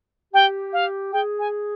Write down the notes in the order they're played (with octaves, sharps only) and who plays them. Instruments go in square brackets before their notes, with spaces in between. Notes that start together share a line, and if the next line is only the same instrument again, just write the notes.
[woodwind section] G4 [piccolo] G5
[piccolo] F5
[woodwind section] G#4 [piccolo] G5
[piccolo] G#5